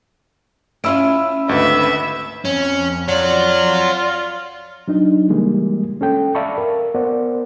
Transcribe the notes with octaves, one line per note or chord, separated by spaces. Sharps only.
C#4 E4 F4 B5 E6 D7
G#1 D2 B4 D#5 E5
F2 C#4
F4 C#5 D5 F#5
F#3 D4 D#4
C#3 E3 G3 G#3 A#3
C#4 A4 G5
D5 E5 F5 A5 B5 C#6
A#4
B3 A#4 C5 D5 F#5